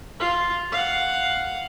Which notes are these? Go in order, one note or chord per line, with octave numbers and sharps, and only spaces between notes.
F4
F5 F#5